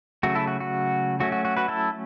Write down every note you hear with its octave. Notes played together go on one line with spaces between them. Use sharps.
C#3 F#3 A3 F#4
E4 A4
F#4
F#4
F#3 A3 C#4 F#4
F#4
F#4
F#4 B4
E4 A4